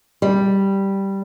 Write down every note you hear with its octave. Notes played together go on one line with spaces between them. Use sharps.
G3